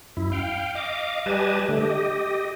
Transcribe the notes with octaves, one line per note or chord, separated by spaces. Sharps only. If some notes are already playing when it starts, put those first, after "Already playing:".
F#2 E4
F5 G5
D#5 F5 D6
G3 G4 B4 D#5 G#5 A5
D3 A3
G4 D#5